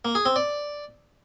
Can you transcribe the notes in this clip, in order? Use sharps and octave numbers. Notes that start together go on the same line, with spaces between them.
A#3
G#4
C4
D5